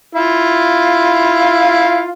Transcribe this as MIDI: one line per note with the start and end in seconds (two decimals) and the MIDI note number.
0.15 2.11 64
0.15 2.11 65
0.15 2.11 77